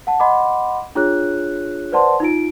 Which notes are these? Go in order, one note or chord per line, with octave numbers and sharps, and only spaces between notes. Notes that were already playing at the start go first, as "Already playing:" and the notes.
F#5 A5
D#5 F#5 B5 C6 D6
D4 F4 G#4 C#5 F#6
B4 C5 D5 F#5 A5 C6
D#4 F4 D7